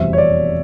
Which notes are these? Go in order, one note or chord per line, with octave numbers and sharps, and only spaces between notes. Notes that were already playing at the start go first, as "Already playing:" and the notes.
Already playing: F1 E2 B2 G3 C4 E5
C#5
D5